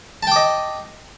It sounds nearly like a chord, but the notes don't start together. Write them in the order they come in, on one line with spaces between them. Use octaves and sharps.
A5 G5 D6 D#5